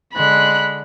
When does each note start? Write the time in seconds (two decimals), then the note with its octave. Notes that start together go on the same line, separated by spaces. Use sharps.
0.15 D3 G#3 B5 F#6